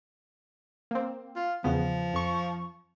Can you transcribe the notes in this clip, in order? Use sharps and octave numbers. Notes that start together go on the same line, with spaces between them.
A#3 C4
F4
E2 C#3 F3 B3
F2 C#6